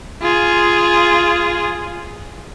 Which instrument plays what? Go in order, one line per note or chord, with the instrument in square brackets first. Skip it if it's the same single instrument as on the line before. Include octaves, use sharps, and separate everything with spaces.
[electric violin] F4 G#4